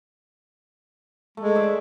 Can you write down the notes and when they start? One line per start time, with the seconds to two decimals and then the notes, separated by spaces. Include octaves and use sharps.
1.37 G#3 A3
1.55 C5 D5 E5